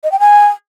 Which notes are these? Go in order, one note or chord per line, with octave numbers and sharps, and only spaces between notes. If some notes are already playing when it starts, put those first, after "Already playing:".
D#5
G5
G#5